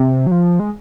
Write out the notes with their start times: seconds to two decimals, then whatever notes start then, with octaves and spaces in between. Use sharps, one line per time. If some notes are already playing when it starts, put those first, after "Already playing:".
Already playing: C3
0.26 F#3
0.31 F3
0.60 G#3